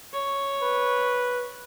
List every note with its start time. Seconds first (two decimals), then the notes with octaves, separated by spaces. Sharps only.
0.13 C#5
0.62 B4